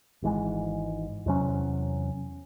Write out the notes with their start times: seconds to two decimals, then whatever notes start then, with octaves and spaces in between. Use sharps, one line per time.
0.22 G#1 G#2 E3 G#3
1.26 E2 C3 F#3 C#4